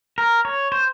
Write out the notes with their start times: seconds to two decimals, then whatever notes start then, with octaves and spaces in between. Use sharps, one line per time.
0.18 A#4
0.45 C#5
0.72 C5